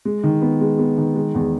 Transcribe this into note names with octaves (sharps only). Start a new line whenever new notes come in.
G#3
D#3
B3
G#3
B3
D#3
G#3
E2